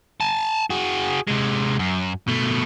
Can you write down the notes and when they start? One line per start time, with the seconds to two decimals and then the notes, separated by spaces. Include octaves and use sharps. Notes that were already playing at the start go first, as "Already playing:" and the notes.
0.20 G#5 A5
0.70 F#4 G#4
1.28 C3 G#3
1.79 F#2
2.28 B2 A3